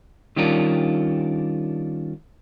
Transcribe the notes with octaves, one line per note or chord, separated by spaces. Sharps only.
D#3 G3 C#4 D4 F4 A#4